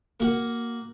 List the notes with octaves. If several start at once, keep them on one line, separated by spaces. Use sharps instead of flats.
A#3 F#4